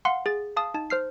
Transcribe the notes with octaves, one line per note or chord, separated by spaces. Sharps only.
F5 F#5 C6
G#4 A6
F5 A5 D#6
D#4 A5
C5 F6 C7